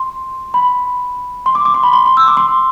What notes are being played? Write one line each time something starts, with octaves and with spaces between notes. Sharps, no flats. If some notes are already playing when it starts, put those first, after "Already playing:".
Already playing: C6
B5
C6
D6
D6
C6
B5
C6
C6
E6
D6
C6